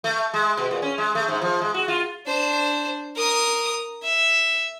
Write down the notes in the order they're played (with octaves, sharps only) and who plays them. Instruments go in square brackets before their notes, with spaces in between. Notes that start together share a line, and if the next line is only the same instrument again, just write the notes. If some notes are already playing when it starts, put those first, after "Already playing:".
[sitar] A3
G#3
B2
A#2
C#4
G#3
A3
G#2
F3
G#3
F#4
F4
[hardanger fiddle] D4 C5
A#4 D#6
E5